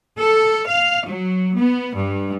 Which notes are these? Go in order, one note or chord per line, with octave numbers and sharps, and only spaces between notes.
A4
F5
F#3
B3
G2